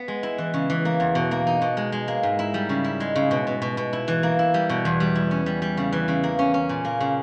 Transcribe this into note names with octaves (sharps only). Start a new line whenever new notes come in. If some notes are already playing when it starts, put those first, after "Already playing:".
Already playing: B3
G#3
E4
E3
C#3
E3
A#3
E2
B2
A#3
D#4
B2
G#3
G#3
A#3
G#2
E4
G3
C#3
E4
G#3
C#3
B2
B2
B2
B2
E4
E3
A#3
E4
G3
B2
E2
G3
E4
C#4
G3
G3
C#3
E3
C#3
A#3
C#4
C#4
A#2
A#3
C#3